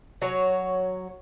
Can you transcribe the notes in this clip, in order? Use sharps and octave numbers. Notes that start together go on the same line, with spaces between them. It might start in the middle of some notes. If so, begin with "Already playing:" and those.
F#3 F#4 C#5